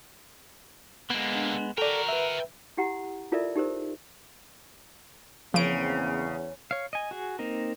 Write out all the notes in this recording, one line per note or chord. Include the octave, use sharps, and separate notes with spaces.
D3 G#3 A#3 B3
D4
F#4 A4 A#4 D5 G5 A#5
B4 E5
E4 G4 F#5 A#5
E4 F4 A4 A#4 D5 E5
D#4 G4 A4 A#4 C5
E2 C#3 F3 A#3 C4 C#4 D7
C#5 F5
D#5 G#5
F#4 G#4
A#3 C4 D#4 A#4